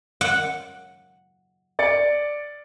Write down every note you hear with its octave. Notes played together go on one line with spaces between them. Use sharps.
F#5
D5 A6 C#7